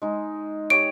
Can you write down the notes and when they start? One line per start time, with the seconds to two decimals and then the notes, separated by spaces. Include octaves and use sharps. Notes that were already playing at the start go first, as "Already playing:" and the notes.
0.02 G#3 D#4
0.70 G4 C#5 D7